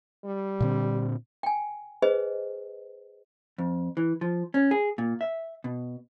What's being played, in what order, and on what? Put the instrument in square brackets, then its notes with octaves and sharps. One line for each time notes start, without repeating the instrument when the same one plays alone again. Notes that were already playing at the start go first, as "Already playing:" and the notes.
[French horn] G3
[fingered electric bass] A#2 D3 C4
[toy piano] G5 G#5
G#4 B4 C5 D#5
[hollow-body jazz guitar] F2
E3
F3
C#4
G#4
A#2
E5
B2